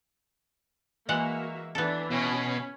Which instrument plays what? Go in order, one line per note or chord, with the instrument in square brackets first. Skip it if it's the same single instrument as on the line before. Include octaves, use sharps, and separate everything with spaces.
[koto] E3 G#3 F#5 [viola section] A#3 F#4 E5
[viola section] E3 D4 [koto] B3 A4
[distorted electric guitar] B2 [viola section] C#4 B5